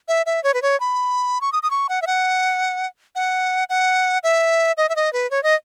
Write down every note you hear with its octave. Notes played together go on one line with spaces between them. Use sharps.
E5
E5
C#5
B4
C#5
B5
C#6
D#6
D#6
C#6
F#5
E5
F#5
F#5
F#5
E5
D#5
E5
D#5
B4
C#5
D#5